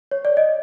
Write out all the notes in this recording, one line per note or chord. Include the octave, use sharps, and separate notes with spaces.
C#5
D5
D#5